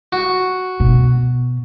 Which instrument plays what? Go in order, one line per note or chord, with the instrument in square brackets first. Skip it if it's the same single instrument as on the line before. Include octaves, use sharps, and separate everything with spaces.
[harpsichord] F#4
[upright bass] B2